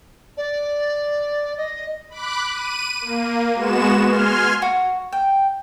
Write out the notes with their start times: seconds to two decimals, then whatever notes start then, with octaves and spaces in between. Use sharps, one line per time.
0.37 D5
1.57 D#5
2.09 B5 D6 F#6
2.52 D#7
3.01 A#3
3.53 G#3 B3 F#4 E7
4.06 G#5 C6 F6
4.62 F#4
5.12 G5